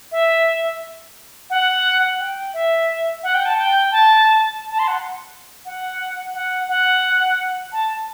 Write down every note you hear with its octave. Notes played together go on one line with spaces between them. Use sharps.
E5
F#5
G5
E5
F#5
G5
A5
G5
A5
A5
C6
F#5
F#5
F#5
F#5
A5